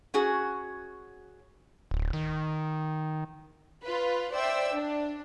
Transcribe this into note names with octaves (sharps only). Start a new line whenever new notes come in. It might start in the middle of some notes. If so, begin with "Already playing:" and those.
C#4 F#4 G#4
D1
D#3
F4 B4
C5 D5 E5 G5 E6
D4